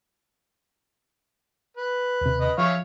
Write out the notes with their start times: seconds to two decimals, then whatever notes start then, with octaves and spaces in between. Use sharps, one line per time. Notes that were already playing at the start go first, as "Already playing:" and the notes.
1.77 B4
2.21 D#2 C3
2.40 B4 D#5
2.58 F3 C#5 E5 F5